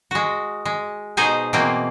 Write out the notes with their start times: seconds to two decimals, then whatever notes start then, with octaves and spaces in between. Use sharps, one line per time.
0.11 G#3 F#4
0.65 G#3
1.17 B2 D#4 G#4 C5 G#5
1.53 B2 E3 A#3 C4